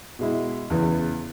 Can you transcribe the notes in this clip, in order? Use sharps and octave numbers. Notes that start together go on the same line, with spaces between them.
B2 G#3 E4
E2 C#3 E3 B3